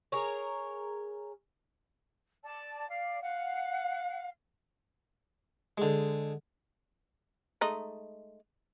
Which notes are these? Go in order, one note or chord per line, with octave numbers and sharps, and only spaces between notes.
G#4 A#4 C#5
D5 A5
D5 F5
F5 F#5
D3 G#3
G#3 A3 D#4